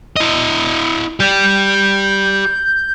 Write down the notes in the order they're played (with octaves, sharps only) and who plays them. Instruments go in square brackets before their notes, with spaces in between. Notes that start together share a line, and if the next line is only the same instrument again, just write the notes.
[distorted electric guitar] E4 D#5
[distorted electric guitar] G4 D5 [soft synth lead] G6